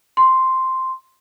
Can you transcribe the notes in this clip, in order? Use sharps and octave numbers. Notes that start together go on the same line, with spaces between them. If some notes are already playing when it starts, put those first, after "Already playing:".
C6